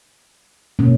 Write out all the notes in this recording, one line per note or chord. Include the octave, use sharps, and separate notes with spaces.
B2 A#3 C#4